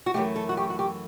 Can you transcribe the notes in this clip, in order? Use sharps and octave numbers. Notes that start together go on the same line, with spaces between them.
F#4
F#2 E3 A3 G4
A4
F#4
G4
F#4
G4